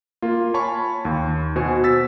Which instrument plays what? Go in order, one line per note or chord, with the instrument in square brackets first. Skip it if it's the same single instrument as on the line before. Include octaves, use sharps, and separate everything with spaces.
[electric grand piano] A#3 F4
C#5 G#5 A5 B5 C#6
D#2
B2 F#4 C5 G#5
E6 A6 B6